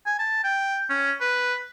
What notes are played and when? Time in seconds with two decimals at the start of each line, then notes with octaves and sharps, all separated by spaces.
0.06 G#5
0.19 A5
0.44 G5
0.90 C#4
1.21 B4